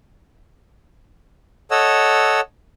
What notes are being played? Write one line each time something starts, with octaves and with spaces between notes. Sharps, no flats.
A4 C#5 D#5 F#5 E6